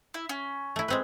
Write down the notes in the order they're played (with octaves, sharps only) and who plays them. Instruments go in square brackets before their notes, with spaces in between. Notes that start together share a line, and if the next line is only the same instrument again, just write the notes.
[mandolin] E4
C#4
[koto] A3 E4
G#3 C4 B4